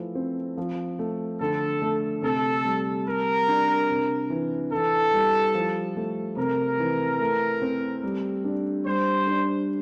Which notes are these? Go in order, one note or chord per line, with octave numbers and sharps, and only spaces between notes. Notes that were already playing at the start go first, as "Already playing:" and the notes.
Already playing: E3 F3 A3
C4
F3
A3
D3 A4
A3
C3 A4
G3
G3 A#4
D4
C3
E3
E3 A4
G3
F3
A3
C3 A#4
E3
A3
C4
G3
D4
G3 C5
D4